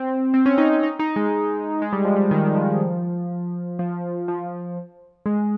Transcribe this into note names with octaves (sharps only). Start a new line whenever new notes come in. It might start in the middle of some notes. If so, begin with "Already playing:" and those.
Already playing: C4
C4
C#4
D#4
D#4
D#4
G#3
G#3
G3
F3
G3
D#3
F3
F3
F3
G#3